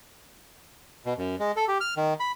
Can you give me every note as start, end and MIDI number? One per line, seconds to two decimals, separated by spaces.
1.06 1.13 47
1.18 1.36 42
1.40 1.52 56
1.57 1.65 69
1.68 1.78 67
1.81 1.94 89
1.97 2.14 51
2.20 2.32 83